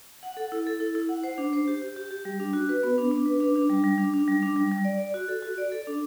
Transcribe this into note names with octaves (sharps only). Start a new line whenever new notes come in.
F#5
A4
E4
A4
E4
E4
F#5
C5
D4
C5
G4
G4
G4
G4
G3
D4
F#4
B4
B3
D4
D4
B4
D4
D4
G3
G3
D4
D4
G3
D4
G3
G3
D5
D5
F#4
A4
F#4
D5
A4
D4